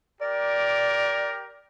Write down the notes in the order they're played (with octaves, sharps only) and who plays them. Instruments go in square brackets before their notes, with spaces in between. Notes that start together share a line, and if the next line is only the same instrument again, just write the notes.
[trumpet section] G4 A#4 [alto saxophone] D5